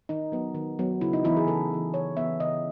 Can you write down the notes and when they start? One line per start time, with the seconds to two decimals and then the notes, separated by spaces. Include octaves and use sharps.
0.09 D#3 D#4
0.32 F#3 B3
0.55 D#3
0.79 F#3 B3
1.01 C#3 E4
1.13 D#4
1.24 E3 B3 E4
1.37 G#4
1.47 C#3 A4
1.70 E3 B3
1.94 C#3 C#5
2.17 E3 B3 E5
2.40 C#3 D#5